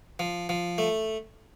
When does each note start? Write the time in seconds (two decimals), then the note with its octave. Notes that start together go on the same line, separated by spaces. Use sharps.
0.19 F3
0.49 F3
0.78 A3